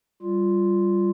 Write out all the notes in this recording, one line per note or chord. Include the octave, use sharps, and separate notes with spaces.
G3 F4